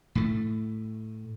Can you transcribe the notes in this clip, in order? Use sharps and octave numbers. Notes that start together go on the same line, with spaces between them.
A2 A3